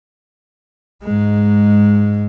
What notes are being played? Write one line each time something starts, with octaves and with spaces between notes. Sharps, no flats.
G#2 G#3